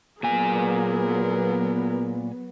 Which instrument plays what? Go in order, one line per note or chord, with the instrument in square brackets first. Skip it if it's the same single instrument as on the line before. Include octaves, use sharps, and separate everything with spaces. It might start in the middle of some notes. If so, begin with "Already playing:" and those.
[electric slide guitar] A#2 G#5 [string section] F#3 B3 [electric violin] G#4 A#4